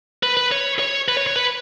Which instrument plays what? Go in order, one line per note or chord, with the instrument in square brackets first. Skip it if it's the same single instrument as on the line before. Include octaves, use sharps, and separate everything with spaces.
[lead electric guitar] B4
B4
C#5
C#5
B4
C#5
C#5
B4